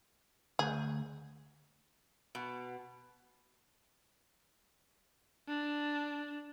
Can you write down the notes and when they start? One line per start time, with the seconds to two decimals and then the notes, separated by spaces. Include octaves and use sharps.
0.59 D2 G#4
2.35 B2
5.48 D4